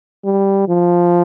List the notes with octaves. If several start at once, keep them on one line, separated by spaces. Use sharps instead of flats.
G3
F3